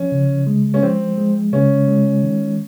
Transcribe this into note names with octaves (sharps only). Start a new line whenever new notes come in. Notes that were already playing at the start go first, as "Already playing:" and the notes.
Already playing: F3 C#4
C#3
G#3
C#4
F3 C4
G#3
C#3 C#4
G#3
D#3